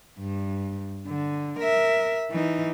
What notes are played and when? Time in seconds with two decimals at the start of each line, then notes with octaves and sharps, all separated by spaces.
0.19 G2
1.07 D3
1.59 A#4 E5
2.31 E3 D#4